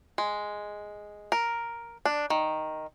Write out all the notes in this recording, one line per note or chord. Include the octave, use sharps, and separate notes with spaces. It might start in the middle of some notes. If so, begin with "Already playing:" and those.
G#3
A#4
D4
D#3